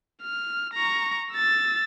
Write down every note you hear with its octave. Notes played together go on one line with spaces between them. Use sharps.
F6
A#5 C#6
E6 A6